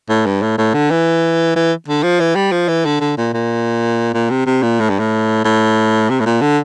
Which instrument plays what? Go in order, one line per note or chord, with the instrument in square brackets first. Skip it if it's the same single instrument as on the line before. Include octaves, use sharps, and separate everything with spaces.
[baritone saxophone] A2
G2
A2
A2
D3
E3
E3
D3
F3
E3
G3
F3
E3
D3
D3
A#2
A#2
A#2
C3
C3
A#2
A2
G2
A2
A2
C3
A2
A#2
D3